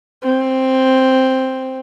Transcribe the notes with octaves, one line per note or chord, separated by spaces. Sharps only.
C4